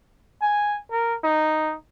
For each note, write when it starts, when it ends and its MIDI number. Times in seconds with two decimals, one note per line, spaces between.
0.42 0.78 80
0.91 1.15 70
1.24 1.76 63